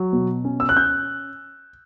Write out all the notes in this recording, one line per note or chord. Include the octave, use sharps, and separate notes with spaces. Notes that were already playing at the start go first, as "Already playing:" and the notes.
Already playing: F#3
B2
C#4
E6
F#6
C#4 G6